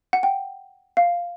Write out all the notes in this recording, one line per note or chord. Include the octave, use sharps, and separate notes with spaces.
F#5
G5
F5